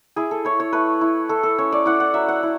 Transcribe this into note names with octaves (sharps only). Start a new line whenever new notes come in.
E4 G#4
A4
E4 C#5
C#5
A3 B4
E4
E4 A4
A4
C#4 C#5
D5
E4 F#5
F#5
F#3 E5
F#5
E4